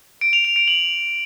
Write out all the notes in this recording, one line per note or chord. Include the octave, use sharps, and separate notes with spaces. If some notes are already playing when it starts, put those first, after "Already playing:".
D7
F7
F7
D7
F#7